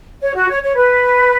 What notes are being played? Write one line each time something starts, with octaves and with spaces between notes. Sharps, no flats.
C#5
F#4
C#5
C#5
B4